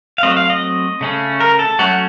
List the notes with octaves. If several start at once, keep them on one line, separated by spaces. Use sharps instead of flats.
F5
F#3 A3 C4 D#5
F5
D#5
C#3 A3 C#4
A#4
A4
F#3 A3 C#4 F#4